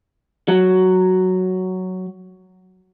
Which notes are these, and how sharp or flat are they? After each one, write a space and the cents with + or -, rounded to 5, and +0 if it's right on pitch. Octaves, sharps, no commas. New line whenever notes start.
F#3 +5